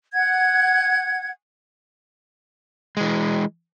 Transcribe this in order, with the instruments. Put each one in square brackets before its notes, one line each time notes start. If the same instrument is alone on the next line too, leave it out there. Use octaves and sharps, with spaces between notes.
[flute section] F#5 G#6
[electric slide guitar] E3 G#3